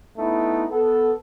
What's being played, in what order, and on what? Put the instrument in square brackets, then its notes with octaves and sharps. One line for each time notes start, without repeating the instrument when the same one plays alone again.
[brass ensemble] A3 B3 D#4 E4
B3 A4